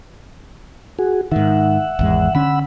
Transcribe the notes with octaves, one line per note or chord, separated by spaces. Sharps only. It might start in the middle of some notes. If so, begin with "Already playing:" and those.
F#4 G#4
G#2 D#3 E5 F#5
G#1 E2 G#3
D3 C#4 F#5 B5 E6